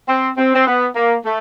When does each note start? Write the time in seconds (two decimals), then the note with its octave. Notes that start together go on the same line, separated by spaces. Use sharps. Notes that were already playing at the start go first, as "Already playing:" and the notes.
0.08 C4
0.37 C4
0.55 C4
0.67 B3
0.95 A#3
1.25 A3